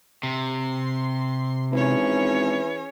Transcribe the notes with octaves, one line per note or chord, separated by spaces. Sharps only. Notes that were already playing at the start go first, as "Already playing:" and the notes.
C3 C6
G#1 E3 C#4 G#4 C#5